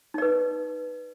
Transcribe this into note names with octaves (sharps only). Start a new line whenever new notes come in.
D#4 B4 D5